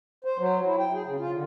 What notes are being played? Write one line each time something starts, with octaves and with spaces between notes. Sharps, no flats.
C5
F#3
E4
G5
G#4
C#3
F4
D3